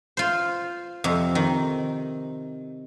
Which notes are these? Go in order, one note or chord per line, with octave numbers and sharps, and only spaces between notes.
F4 C5
F2 C3
D#3